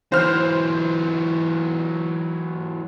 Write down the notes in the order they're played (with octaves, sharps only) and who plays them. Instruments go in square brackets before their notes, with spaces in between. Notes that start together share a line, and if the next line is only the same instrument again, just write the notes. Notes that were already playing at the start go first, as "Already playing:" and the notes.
[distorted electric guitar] E3 F#3 [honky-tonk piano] C5 F6